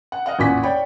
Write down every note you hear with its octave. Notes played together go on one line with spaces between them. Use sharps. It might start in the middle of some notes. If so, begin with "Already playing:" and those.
F#5
D#5 F5 F#5
A1 E2 A#2 F#5 G#5 B6
C#5 D5 G5 B5